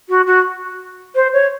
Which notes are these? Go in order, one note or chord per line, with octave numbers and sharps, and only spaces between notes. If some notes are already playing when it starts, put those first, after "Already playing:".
F#4
F#4
C5
C#5